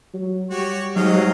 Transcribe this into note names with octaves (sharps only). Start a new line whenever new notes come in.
F#3
G3 F#4 G4 C#5
G#2 F#3 D#5 F5 G5